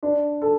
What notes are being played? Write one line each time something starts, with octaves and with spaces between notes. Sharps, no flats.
D4
A4